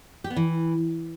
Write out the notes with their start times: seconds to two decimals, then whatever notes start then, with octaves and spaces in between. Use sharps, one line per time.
0.24 G4
0.30 B3
0.36 E3